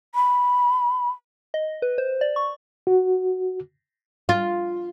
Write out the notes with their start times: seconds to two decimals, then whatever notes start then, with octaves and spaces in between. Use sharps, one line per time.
0.15 B5
1.54 D#5
1.82 B4
1.98 C5
2.21 D5
2.36 C#6
2.87 F#4
4.29 F4